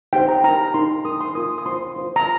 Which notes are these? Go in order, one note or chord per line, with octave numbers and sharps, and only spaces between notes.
D#4 G4 C5 G5
A#5
D#4 A#4 A#5
D#4 A#4 C6
D#4 A#4 D#6
C6
F4 A#4 D#6
D#6
F4 C5 C6
F4 C5
A#5